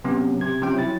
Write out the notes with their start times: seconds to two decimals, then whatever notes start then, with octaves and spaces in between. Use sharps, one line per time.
0.04 C3 F#3 B3 C#4
0.41 C3 G#6
0.62 C3 F3 C#4 G5
0.77 F#3 E4 A6